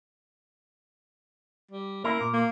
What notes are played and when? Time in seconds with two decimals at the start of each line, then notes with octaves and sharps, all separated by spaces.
1.71 G3
2.04 A#3 C#4 E4 A#4
2.21 A#2
2.33 A#3